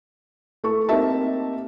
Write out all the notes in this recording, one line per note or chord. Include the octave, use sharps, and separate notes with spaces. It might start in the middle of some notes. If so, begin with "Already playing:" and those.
A3 E4 A4 C#6
A#3 C4 D#4 G4 E5 A5